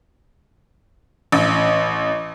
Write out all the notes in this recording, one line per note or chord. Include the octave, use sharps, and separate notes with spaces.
A1